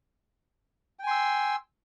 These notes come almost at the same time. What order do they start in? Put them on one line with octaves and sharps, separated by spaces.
G5 G#5 C6 E6